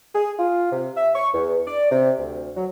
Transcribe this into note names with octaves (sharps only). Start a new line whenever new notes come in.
G#4
F4
C3
E5
C#6
E2
D5
C3
D2
F#3